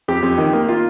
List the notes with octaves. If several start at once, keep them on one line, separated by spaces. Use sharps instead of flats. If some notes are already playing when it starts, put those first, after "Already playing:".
F2 G4
F2
D#3
A#3
F4